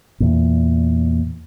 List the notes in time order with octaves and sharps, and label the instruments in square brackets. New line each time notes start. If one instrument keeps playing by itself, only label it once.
[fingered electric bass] E2 A#2